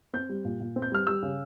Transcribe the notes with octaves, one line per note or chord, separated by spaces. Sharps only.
C4 G6
G3
A#2
A#2
C4
G6
G3 F6
G3 E6
C#3